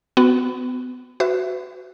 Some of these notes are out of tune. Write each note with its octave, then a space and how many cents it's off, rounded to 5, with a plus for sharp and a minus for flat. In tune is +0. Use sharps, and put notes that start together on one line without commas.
B3 +30 F#4 -5
F#4 +0 B4 +40 E5 +10